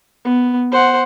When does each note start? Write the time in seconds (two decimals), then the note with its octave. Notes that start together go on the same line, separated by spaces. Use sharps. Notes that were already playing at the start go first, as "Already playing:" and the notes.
0.25 B3
0.72 C5 F#5